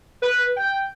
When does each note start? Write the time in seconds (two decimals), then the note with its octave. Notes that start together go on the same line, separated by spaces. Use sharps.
0.22 B4
0.57 G5